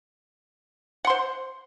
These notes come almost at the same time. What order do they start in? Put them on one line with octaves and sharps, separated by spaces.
F#5 C6 C5